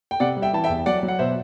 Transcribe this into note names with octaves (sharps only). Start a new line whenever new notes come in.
G5
C3 D5 F#5
G3
E5 G5
E3 A5
E5 G5
E2
F#3 D5 F#5
F#3
F#5
B2 C5 E5